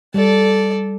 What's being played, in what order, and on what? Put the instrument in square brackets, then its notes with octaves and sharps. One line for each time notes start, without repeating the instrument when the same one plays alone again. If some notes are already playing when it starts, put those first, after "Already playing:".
[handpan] G3 [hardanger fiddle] A4 D5